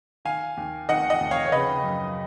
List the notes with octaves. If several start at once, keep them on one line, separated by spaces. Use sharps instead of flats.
D#3 F5 G#5
D#2
D#3 D#5 F#5
D#5 F#5
D#2
C#5 F5
C#5
C#3 B4 D#5
F#2